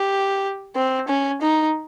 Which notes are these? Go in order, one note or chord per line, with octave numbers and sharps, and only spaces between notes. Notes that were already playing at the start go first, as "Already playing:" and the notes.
Already playing: G4
C4
C#4
D#4